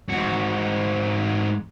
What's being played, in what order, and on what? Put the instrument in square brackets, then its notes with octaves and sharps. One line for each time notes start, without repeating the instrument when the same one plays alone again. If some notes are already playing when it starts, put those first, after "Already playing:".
[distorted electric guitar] G#2 F#4